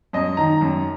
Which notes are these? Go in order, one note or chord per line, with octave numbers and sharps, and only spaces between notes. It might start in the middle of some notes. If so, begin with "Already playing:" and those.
F#2 D#5
D#3 A#5
F#2